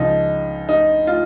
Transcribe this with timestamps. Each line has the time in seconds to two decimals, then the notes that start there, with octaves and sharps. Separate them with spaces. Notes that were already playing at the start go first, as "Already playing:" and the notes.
Already playing: C#2 C#3 F3 D#4
0.69 D#4
1.07 F4